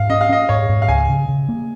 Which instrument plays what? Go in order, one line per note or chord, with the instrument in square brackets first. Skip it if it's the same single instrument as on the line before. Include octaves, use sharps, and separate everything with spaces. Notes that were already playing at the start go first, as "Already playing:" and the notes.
Already playing: [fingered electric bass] G#2 [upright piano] F5
[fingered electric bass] C#4 [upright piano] D#5
[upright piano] F5
[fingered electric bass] C#4 [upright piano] D#5
[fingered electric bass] G#2 [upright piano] C#5
[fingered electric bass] G#2
[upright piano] F5
[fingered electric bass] C#2 [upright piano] G#5
[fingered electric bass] C#3
C#3
A#3